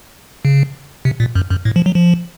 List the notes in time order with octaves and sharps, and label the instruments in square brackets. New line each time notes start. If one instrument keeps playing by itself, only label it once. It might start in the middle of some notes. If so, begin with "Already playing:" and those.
[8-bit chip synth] C#3
C3
A#2
F#2
F#2
A2
F3
F#3
F3